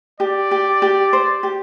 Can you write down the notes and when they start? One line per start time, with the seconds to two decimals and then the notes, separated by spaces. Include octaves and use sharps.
0.20 G4 D5
0.51 G4
0.82 G4
1.13 C5
1.43 G4